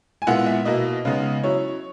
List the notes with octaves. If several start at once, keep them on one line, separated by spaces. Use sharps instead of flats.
G#5
A#2 G#3 B3 E4 F#5
E5
B2 A#3 E4 D#5
C#3 G#3 B3 D#4
F#3 C#4 E4 C#5